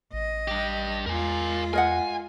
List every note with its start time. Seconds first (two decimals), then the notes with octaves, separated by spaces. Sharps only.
0.13 A1 D#5
0.48 G2 G4
1.06 E2 G#3 F4 A#4 G#5
1.73 A#4 D#5 F#5 G#5